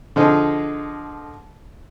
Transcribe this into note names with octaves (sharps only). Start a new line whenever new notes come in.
D3 F3 D#4 G#4